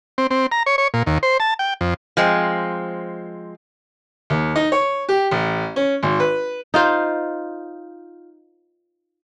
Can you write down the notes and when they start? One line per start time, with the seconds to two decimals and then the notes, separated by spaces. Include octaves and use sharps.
0.18 C4
0.31 C4
0.52 A#5
0.66 C#5
0.78 C#5
0.94 A#2
1.06 D#2
1.23 C5
1.40 A5
1.59 G5
1.81 F2
2.17 F3 G#3 C4
4.30 D#2
4.56 D#4
4.72 C#5
5.09 G4
5.31 A1
5.76 C#4
6.03 G#1
6.20 B4
6.74 D#4 F4 C5